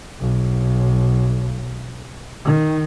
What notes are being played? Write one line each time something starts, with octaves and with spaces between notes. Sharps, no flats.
B1
D#3